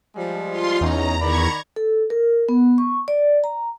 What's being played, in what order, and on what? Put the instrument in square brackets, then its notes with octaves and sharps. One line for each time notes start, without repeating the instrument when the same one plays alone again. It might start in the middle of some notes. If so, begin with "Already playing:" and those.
[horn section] F3 G3 G#3
[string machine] F4 C6
[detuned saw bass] E2 [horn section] C#4 D#4 [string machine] A#5
[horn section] D#3 D5 B5 [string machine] A#5 C#6 G#6
[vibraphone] A4
A#4
B3
C#6
D5
A#5